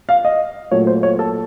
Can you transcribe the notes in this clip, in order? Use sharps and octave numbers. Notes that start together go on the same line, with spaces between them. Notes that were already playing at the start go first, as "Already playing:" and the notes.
F5
D#5
A#2 F#3 A3 C#5
C5
C#5
A4